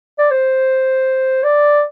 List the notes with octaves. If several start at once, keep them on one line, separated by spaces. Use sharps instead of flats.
D5
C5
D5